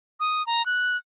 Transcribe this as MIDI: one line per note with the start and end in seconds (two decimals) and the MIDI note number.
0.20 0.45 87
0.47 0.65 82
0.66 0.97 90